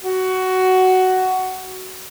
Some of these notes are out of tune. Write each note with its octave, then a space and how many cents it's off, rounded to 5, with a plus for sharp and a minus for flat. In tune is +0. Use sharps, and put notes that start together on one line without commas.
F#4 +10